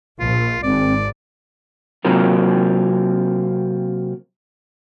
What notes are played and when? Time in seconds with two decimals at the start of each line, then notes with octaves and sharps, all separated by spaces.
0.20 A#1 F4
0.63 G#1 C4 D5
2.05 C3 F#3 A#3 C4 F4 A#4